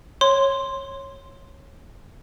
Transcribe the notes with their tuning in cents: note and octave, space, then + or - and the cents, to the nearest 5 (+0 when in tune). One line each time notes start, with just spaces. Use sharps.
C#5 -15 C6 +0